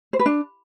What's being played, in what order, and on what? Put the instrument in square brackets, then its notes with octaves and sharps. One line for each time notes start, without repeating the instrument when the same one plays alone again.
[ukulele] C5
B4
D4